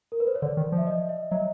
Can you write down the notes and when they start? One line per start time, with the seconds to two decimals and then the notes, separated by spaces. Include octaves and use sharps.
0.12 A#4
0.20 B4
0.27 C5
0.35 C#5
0.42 D3 D5
0.57 D#3
0.72 F3
0.78 E5
0.87 D#5
1.09 E5
1.31 F#3 D#5